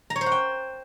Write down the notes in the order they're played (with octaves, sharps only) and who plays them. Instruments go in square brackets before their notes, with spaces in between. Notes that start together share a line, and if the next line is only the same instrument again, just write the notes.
[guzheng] A#5
C#5
C5
F#5
G5